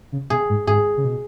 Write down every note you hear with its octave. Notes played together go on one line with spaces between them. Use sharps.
C#3
B2 G#4
G#2
G#2 G#4
C#3
B2